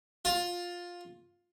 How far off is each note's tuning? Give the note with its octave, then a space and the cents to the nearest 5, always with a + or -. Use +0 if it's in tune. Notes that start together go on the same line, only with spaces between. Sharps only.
F4 +10